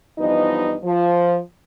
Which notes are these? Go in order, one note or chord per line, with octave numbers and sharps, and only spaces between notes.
G2 E3 F3 B3 D#4 D#5
F3